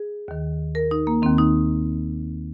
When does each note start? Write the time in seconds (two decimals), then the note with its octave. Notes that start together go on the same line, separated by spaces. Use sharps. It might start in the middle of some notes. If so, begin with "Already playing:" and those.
Already playing: G#4
0.28 D#2 D#3
0.75 A#4
0.91 D#4
1.07 A#3
1.22 D#2 D#3 C4
1.38 D#4